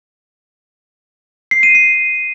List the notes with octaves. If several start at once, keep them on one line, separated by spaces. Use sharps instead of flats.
C7
D#7
C7